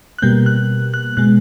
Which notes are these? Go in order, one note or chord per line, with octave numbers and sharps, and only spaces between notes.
F#6
B2 G3 A#3 G6
F#6
F#6
B2 G#3 F#6